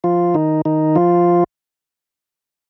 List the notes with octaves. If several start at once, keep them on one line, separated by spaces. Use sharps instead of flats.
F3 F4
D#3 D#4
D#3 D#4
F3 F4